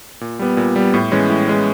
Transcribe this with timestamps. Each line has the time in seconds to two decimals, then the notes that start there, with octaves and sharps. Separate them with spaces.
0.21 A#2
0.39 G3 B3
0.57 A#2
0.76 G3 B3
0.94 A2
1.12 E3 G#3 C#4
1.30 A2
1.48 E3 G#3 C#4